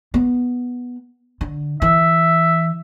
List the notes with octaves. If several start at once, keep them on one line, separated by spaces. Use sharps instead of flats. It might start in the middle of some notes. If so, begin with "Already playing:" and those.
B3
D3
E3 E5